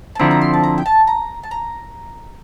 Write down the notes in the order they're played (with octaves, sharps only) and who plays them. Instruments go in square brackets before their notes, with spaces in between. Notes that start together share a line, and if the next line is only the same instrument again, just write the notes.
[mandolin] A5
[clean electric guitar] D3 F3 C4 E4 [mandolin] A#5
[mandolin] A#5
C6
A5
A#5
G5
A5
A#5
A5
A#5